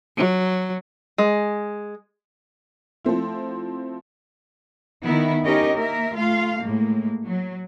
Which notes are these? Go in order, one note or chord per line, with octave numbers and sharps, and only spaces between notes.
F#3
G#3
F3 A3 C4 E4
D#3 B3 E4
C#4 D#4 G4 A#4 C#5 D#5
A#3 A#4 E5
A3 F4 F5
A2 G#3 A#3
F#3